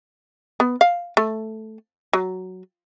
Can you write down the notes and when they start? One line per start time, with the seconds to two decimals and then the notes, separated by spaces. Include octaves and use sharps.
0.60 B3
0.81 F5
1.17 A3
2.13 F#3